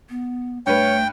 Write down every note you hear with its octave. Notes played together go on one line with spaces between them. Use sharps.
B3
G2 A3 B4 C#5 G5